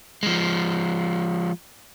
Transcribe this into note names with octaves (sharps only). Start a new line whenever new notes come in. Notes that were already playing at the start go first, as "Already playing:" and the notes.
F3 G#3